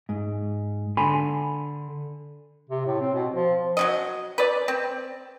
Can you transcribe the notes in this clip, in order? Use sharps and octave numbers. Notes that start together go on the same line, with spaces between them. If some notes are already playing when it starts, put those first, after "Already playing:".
G#2
D3 G#5 B5 C6
C3
A2
C4
B2
F3
F#3 C#4 D#5
B4 D5
C4